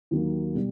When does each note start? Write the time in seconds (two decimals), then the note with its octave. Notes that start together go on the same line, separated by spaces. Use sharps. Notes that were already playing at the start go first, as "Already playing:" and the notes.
0.11 D#2 D#3 F#3 A#3
0.55 B2 G3